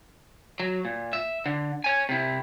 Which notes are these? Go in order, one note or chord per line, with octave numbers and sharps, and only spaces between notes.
F#3
A#2
E5
D3
C#5 G#5
C3 E4